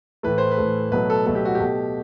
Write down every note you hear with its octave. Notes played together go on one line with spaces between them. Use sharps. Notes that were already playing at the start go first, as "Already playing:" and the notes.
A2 E3 A3 B4
C5
B4
A2 E3 A3
B2 F#3 A3 B4
A4
B2 F#3 A3 A4
G4
F#4
G4
B2 A3